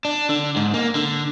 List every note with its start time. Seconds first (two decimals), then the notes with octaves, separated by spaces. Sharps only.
0.05 D4
0.29 D3
0.56 G#2
0.74 A#3
0.95 D3